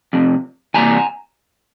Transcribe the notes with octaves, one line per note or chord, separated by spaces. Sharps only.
F2 C3
C3 E3 G3 A#3 G#5 A#5